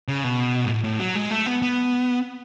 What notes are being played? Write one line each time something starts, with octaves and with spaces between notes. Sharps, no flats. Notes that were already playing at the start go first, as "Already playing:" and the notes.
C#3
B2
G#2
A2
A2
F#3
G#3
A3
B3
B3